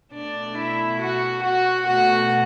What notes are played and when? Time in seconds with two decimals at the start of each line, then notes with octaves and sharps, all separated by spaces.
0.13 B2 A3 D4 D5
0.57 E4 E5
1.00 F#4 F#5
1.43 F#4 F#5
1.86 B2 A3 F#4 F#5